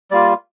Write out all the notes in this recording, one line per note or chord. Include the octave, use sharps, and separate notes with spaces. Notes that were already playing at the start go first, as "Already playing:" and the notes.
G3 A#3 F4 D5